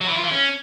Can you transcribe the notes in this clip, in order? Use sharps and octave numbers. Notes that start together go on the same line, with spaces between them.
F#3
E3
F4
E3
C#4